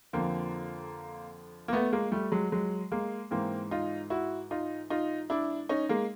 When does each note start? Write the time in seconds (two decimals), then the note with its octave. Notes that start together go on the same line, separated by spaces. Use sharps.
0.13 F2 D3 F3 A#3 C4
1.68 A#3
1.73 A3 B3
1.92 G#3 A#3
2.12 G3 A3
2.32 F#3 G#3
2.52 F#3 G#3
2.92 G#3 A#3
3.31 G#2 E3 A#3 C4
3.71 D#4 F4
4.10 E4 F#4
4.51 D#4 F4
4.90 D#4 F4
5.30 D4 E4
5.69 C#4 D#4
5.89 G#3 A#3